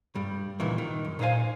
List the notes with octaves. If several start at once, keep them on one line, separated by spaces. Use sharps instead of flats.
G2 G3
C#2 A#2 D#3 E3
D#3
F#2
A#2 D#4 B4 C5 F5 G#5